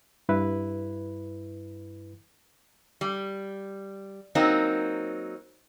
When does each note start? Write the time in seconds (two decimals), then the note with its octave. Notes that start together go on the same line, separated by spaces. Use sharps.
0.29 G2 E4 B4
3.01 G3
4.35 F#3 A#3 C4 D#4